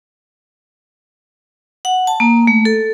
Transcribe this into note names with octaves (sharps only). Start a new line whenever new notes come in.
F#5
A5
A#3
A3
A4